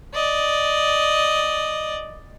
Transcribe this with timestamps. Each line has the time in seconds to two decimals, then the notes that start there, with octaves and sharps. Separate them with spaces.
0.14 D5 D#5